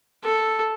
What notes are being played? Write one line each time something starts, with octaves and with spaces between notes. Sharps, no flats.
A4